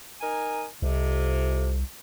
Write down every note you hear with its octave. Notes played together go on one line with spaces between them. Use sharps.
D#4 A#4 G#5
C2 F2 C3